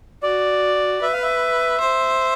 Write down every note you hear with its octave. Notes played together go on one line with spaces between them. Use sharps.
F#4 D5
B4 E5
F5
E5
C5